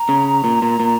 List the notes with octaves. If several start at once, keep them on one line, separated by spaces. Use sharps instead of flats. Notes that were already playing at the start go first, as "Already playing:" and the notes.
Already playing: A#5
C#3
A#2
A#2
A#2